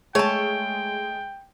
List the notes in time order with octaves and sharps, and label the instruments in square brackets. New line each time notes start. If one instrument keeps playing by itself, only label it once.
[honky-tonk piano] G#3 [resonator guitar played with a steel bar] A3 A5 [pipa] C#5 [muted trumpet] G5